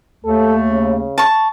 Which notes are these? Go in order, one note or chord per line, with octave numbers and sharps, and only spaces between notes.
D#2 A3 A4
C#3
A5 C#6